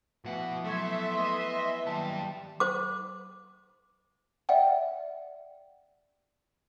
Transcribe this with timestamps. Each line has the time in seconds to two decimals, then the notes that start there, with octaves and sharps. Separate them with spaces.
0.25 B2 E3 F3 A3 B3 F#5
0.65 F#3 A3 B3 E5 C6 C#6 G#6
1.18 D#5
1.86 D#3 F#3 G3 A#3 A5
2.60 C5 D6
4.49 D5 E5 F#5 G5